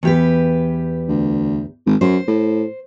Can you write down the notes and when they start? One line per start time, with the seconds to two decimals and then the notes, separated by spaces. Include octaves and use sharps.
0.03 E2 G4 B4
1.08 D2
1.86 G#1
2.01 F#2 C5
2.28 A2